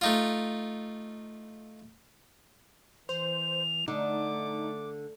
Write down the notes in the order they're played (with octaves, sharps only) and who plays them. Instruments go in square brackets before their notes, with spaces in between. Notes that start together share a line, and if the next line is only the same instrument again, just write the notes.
[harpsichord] A3 D#4 F4
[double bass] E3 [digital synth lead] C5 [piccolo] F7
[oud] D3 [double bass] A3 [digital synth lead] D#4 [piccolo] D6